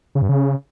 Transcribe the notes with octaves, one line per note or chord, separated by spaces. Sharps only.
C#3
G2
C#3